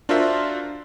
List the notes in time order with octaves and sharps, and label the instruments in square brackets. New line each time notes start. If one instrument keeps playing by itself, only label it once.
[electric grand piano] D4 F4 F#4 A#4 C5 E5